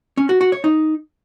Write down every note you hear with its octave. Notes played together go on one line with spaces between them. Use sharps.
C#4
F#4
F#4
C#5
D#4